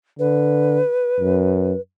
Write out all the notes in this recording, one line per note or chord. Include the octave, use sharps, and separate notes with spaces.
D3 B4
F#2